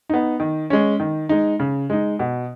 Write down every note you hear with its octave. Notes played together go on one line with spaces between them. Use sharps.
B3 D#4
D#3
G#3 C#4
D#3
G#3 D#4
C#3
G#3 D#4
B2